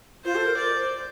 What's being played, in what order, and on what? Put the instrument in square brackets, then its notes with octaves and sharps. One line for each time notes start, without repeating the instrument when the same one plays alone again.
[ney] F4 [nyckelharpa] C5
[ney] A4
A#4
[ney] C5 [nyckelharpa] D5